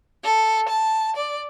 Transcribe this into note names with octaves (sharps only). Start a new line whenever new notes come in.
A4
A5
D5